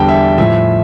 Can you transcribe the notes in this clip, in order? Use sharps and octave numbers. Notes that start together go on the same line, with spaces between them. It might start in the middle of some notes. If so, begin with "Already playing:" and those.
Already playing: E2 D3 G3 G5 A5
E5
A2 F3 E5